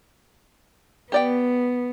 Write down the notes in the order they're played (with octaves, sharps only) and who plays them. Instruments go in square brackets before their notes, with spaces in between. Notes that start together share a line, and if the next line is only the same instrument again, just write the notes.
[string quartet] B3 [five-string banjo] G4 D5 G5